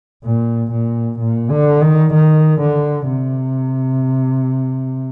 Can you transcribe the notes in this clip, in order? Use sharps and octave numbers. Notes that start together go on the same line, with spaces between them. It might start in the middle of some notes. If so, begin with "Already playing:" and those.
A#2
A#2
A#2
D3
D#3
D#3
D3
C3